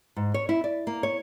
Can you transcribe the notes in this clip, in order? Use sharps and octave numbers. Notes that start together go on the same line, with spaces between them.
G#2
C#5
E4
D5
A#3
C#5